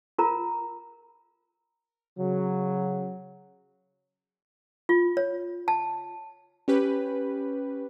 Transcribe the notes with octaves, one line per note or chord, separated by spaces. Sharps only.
F4 A#4 A#5
C#3 F#3
F4
C#5
A5
C#4 G4 B4